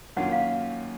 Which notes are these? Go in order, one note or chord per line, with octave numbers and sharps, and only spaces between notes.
F#2 D#3 A#3 C#4 F4 F#5
F5